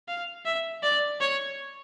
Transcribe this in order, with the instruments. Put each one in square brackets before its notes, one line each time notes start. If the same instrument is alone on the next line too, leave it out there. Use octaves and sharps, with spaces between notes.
[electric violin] F5
E5
D5
C#5